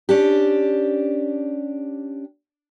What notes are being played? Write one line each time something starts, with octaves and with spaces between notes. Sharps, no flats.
C#4 D4 G4